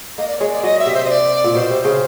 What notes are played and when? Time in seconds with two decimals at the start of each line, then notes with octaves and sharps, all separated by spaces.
0.18 A#3 D#5
0.28 D5
0.38 G#3 C#5
0.48 D5
0.63 F#3 D#5
0.79 E5
0.86 C3
0.94 C5
1.05 D#5
1.10 D5
1.44 A#2
1.55 B2 C5
1.70 C3
1.85 C#3